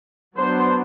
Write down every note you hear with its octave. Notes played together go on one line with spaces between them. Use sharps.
F#3 B3 D4 C5